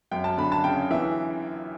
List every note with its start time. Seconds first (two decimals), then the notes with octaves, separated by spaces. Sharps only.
0.11 F#2 G5
0.24 A5
0.38 D3 B5
0.52 A5
0.64 C#3 G5
0.91 E3 E5